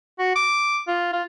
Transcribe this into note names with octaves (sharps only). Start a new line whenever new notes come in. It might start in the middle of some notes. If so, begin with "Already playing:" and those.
F#4
D6
F4
F4